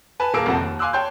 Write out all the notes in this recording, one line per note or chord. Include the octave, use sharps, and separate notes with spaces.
B4 G#5 A5
D#1 A#3 G#4 A5 E6 D7
F1 F2 F3 F#5 A5
D#2
F5 G#5 C6 D6 E6 F#6
C#5 G5 A5 C6 G6